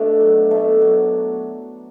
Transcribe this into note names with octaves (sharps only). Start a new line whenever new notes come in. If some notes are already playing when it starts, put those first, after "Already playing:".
Already playing: B2 A3 D4
F#3
B2 A3
F#3